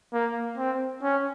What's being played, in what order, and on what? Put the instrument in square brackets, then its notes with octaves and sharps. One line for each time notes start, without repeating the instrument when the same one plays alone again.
[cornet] A#3
C4
C#4